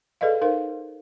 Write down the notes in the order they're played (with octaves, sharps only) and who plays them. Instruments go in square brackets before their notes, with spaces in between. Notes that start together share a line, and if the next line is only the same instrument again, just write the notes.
[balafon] G#4 A4 B4 D5 D#5 F5
D#4 A#4 C5 F5